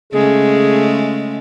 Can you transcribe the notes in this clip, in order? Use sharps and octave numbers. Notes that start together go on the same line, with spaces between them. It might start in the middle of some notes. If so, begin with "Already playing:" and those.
C#3 G#3 A3 G#4